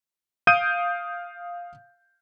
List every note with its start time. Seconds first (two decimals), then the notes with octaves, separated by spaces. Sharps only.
0.47 F5 D#6 G6 D7 D#7